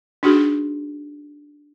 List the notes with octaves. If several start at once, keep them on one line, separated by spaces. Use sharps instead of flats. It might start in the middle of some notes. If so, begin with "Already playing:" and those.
D4 D#4 F#4 G#4